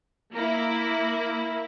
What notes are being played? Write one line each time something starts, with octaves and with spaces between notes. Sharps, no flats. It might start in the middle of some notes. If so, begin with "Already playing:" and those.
A#3 E4